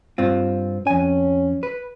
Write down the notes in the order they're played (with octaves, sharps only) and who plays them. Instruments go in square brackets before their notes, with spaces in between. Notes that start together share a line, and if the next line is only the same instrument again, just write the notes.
[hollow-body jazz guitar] G2 C4 F4
[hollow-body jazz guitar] F2 G#5 [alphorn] C#4
[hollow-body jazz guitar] B4